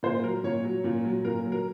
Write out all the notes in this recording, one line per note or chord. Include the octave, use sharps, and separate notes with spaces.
A#2 C5
F#3 A#4
A#2 C#5
F#3
A#2
F#3
A#2 A#4
F#3
A#4